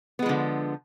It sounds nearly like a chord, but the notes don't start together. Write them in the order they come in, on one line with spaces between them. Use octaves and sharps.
B3 G#3 F3 D3